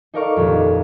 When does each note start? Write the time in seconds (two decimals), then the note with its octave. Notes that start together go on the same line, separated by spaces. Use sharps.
0.14 D#4 A4 A#4 D5 F5 C#6
0.37 D#1 A#1 F2